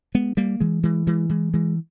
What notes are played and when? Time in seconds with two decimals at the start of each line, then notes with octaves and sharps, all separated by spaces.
0.15 G#3 B3
0.37 G3 A#3
0.60 E3 G#3
0.83 E3 G#3
1.07 E3 G#3
1.29 E3 G#3
1.53 E3 G#3